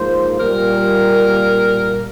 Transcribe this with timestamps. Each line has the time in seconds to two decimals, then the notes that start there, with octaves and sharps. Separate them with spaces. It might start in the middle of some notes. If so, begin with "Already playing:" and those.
Already playing: G#2 F3 A#3 C5
0.39 A#2 G3 A#3 A#4